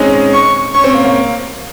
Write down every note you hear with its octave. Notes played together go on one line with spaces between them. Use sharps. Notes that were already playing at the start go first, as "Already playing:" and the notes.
Already playing: G#3 C4 C#4 D#4
C#6
C#4 C#6
C4
A#3
A#3